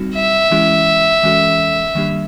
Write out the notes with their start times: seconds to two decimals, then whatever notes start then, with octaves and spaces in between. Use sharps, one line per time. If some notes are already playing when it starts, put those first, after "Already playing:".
Already playing: G3 C4 D#4 F#4
0.15 E5
0.51 E3 G#3 C#4 E4 G4
1.23 E3 G#3 C#4 F#4 A4
1.95 D#3 G3 A#3 D4 G4